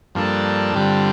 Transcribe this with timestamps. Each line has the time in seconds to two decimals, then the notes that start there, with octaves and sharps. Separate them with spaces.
0.15 G2 F3 A#3 D4 A4
0.75 G2 D3 G3 C4 F4